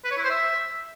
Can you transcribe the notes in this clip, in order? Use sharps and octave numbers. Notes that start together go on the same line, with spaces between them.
B4
C#5
E4
C5
E5